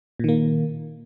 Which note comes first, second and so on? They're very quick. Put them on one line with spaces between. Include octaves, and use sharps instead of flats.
A#2 D#3 A#3